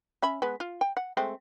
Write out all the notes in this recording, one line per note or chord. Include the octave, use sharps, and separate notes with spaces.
C#4 E5 B5
G#3 B3
F4
G5
F#5
G#3 A3 C4